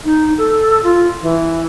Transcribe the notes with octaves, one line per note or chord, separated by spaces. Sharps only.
D#4
A4
F4
E3